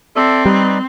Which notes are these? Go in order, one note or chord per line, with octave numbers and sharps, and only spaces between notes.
C4 A4 D5 E5
G3 D#4 B4 D5